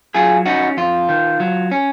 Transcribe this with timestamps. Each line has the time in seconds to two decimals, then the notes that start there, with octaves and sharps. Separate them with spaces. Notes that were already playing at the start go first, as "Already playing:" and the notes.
0.14 F#3 F4 G#4
0.46 C#4 D#4 F#4
0.77 F2 F4
1.09 D#3
1.40 F#3
1.71 C#4